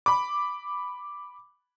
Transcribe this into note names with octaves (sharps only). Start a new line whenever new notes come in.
B5 D6